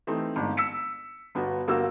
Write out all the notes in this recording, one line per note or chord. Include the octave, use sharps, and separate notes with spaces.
E3 A3 C4 D#4
G1 G#2
E6 B6 C#7
G1 B3 F#4
G1 A#3 F#4 F5 E6